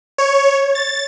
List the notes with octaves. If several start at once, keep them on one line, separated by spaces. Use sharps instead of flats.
C#5
A6